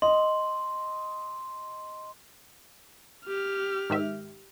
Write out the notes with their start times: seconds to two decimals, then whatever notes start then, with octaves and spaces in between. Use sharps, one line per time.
0.02 D#5 C6
3.26 G4 F6
3.90 G#2 D#3 E5